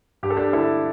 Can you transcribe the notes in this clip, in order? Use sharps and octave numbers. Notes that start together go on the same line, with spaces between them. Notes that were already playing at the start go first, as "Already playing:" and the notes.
G2 G4
A4
D4 G4
D3 E4 A4